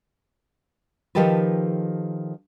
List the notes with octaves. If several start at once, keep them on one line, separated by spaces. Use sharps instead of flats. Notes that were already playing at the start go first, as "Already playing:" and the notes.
D#3 F3 D#4 G4 A4 B4